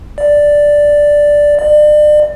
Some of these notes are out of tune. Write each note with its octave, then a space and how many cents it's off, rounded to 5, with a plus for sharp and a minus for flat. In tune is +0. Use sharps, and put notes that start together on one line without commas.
D5 +0
D5 +35